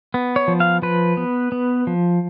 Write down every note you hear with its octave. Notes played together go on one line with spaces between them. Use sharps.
B3
C#5
F3
F5
F3 B4
B3
B3
F3